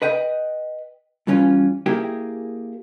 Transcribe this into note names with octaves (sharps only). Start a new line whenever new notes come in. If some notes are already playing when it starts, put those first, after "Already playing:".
B4 D#5 G5
G2 E3 C#4 F4
A#3 E4 G4 G#4 A#4 G5